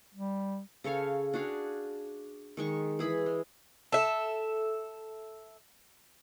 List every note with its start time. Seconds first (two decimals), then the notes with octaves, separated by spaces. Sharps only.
0.14 G3
0.84 C#3 A4 C#5 F5
1.33 D4 F#4 G#4 F5
2.57 D#3 G#3 C#6
2.99 E3 G#4 B5
3.26 G#3
3.92 A4 E5